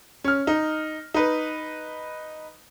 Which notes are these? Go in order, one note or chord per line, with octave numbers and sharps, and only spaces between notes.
C#4 F6
D#4
D#4 B4